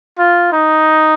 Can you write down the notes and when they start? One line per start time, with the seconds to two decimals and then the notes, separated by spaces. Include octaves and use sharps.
0.18 F4
0.52 D#4